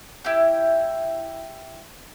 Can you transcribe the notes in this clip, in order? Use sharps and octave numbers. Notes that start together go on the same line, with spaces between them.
E4 G4